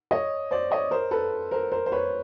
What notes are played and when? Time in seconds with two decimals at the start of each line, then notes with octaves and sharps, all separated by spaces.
0.11 C#5 D#5
0.51 C5 D5
0.71 C#5 D#5
0.91 A#4 C5
1.11 A4 B4
1.51 A#4 C5
1.72 A#4 C5
1.86 C5
1.92 B4 C#5